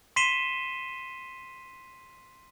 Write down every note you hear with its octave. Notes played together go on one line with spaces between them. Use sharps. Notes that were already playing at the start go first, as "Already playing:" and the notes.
C6 B6 C7 D#7 E7 G7